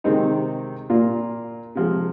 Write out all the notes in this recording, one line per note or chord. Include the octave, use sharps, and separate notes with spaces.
C3 D#3 G#3 C4 D#4
A#2 A#3 F4
C3 F3 G#3